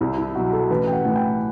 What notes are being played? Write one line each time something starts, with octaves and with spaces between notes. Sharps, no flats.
C2 E4
E4
B2 F#3 F#4
A4
A1 B4
G5
F#5
A2 E3
G5